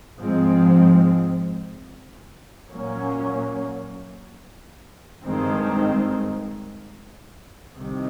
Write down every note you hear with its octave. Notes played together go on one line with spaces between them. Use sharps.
G#2 F3 G#3 C4
A#2 F#3 A#3 C#4
G2 D#3 G#3 C4
C2 C3 D#3